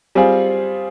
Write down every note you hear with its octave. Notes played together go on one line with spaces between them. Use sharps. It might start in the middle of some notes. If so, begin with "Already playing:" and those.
G3 C4 F4 G#4